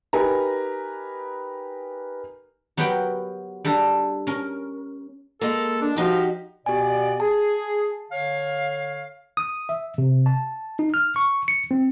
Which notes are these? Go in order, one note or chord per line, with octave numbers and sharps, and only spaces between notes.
D#4 G4 A#4 B4 G#5 A#5
F#3 B3 G4 A#4 F#5 G5
G3 D4 A4 A#5
C#4 A#4
G#3 A#3 A4
D4
F3 D#4 F#4 G4
B2 B3 G4 D5 G#5
G#4 A5
D3 C#5 F5
D#6
E5
C3
A5
D#4
F6
C#6
C#7
C4